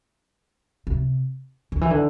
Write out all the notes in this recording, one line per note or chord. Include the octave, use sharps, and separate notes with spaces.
C3
D3
E3
D3